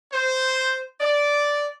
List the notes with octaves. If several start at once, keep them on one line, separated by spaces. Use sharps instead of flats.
C5
D5